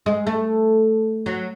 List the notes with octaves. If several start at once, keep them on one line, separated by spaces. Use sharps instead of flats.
G#3
A3
F#3